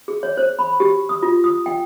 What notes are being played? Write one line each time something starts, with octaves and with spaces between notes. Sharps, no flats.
G#4
C#5
C5
B5
G4
D#6
F4
D#6
G5